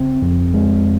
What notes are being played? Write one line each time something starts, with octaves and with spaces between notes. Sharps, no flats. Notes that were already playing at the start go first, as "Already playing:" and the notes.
Already playing: C#3 C4
F2
G#3